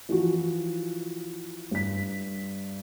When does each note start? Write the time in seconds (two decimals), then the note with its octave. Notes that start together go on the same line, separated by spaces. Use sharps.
0.09 E3 F3 F#4
1.71 G2 B6